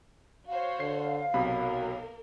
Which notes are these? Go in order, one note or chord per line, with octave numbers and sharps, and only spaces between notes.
F#4 C5 C#5 F5
D3 C7
B1 C3 F#3 A#3 A#4 B5